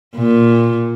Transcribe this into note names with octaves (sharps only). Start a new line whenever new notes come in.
A#2